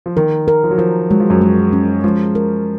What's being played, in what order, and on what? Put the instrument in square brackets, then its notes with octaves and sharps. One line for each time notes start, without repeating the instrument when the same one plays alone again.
[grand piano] F3
[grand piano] D#3 [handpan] A#4
[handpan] A#4
[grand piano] F3
F#3
[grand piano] F3 [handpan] A#4
[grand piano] F#3 [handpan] G#3
[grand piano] F3
F#2 F#3
[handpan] G#3
C#4
[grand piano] F3 [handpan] G#3
[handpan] A#4